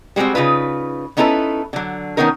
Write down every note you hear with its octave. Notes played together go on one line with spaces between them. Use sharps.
G3 G#3 A#3 C4 F#4
C#3 D#4 F4 B4
B3 C#4 D#4 E4 A4 B4
D3 F#3
D#3 G3 B3 C#4 D#4 A#4